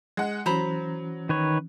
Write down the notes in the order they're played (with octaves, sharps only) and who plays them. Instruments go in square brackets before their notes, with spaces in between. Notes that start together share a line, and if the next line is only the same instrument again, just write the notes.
[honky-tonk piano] G#3 F#5
[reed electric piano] E3 C#4 [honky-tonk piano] F#3 [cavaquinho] C5 A#5 B5
[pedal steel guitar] D#3 B4 C#5